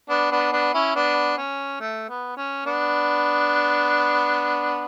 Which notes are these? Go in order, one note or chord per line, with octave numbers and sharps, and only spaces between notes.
B3 D4
B3 D4
B3 D4
C#4 E4
B3 D4
C#4
A3
B3
C#4
B3 D4